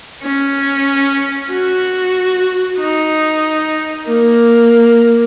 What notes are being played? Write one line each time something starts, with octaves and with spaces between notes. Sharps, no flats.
C#4
F#4
D#4
A#3